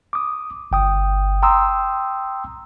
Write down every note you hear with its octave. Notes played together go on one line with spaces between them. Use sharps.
D6 D#6
G1 G5 D#6
G5 A#5 C6 D#6 E6